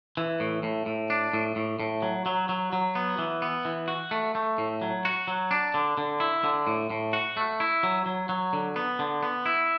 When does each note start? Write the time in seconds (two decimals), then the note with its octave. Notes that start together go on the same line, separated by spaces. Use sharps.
0.17 E3
0.40 A2
0.63 A2
0.86 A2
1.10 D4
1.33 A2
1.56 A2
1.80 A2
2.02 F#3
2.26 F#3
2.49 F#3
2.73 F#3
2.95 B3
3.18 E3
3.42 B3
3.65 E3
3.88 F#4
4.11 A3
4.35 A3
4.58 A2
4.82 F#3
5.05 F#4
5.27 F#3
5.51 D4
5.74 D3
5.97 D3
6.20 E4
6.44 D3
6.67 A2
6.90 A2
7.13 F#4
7.37 A3
7.60 E4
7.83 F#3
8.06 F#3
8.29 F#3
8.53 D3
8.76 B3
8.99 D3
9.23 B3
9.46 E4